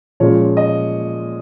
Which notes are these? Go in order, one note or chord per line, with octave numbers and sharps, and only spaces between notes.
A#2 F3 G#3 C#4 C#5
D#5